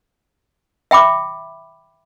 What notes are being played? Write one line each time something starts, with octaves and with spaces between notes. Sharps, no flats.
E5 G5 B5 D6